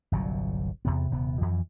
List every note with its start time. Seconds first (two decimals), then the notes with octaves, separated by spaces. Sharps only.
0.12 G1 C2 A#2 F#3
0.85 E2 C3 B3
1.11 D#1 C3 B3
1.41 F2 E3